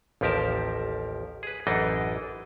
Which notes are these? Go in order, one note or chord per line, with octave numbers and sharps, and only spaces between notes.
A1 D#2 F3 G4 A#4 A5
G#4 B4
A1 F#2 E3 D4 D#4 D#5